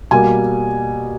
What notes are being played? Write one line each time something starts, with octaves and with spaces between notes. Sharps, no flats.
B2 G3 A#3 G#5